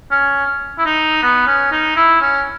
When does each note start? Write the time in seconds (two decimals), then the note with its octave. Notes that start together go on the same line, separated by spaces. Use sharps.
0.11 C#4
0.78 E4
0.85 D#4
1.23 B3
1.47 C#4
1.72 D#4
1.96 E4
2.21 C#4